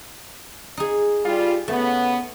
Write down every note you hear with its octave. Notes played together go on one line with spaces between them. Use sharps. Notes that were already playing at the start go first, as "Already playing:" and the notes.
D#4 G#4
G3 F4
C#3 A3 B3